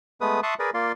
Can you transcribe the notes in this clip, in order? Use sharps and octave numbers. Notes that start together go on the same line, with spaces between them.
G#3 A3 B3 B4 D#6
E5 A5 C6 C#6 D#6 F#6
G#4 A#4 B4 D5
A#3 F4 D5 C6